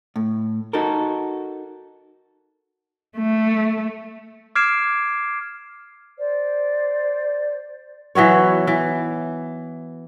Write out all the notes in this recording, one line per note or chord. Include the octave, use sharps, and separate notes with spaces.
A2
D#4 F#4 A4 A#4
A3
D6 F6 G#6 C7 D7 E7
C5 D5
E3 F#3 B3 C#5
E3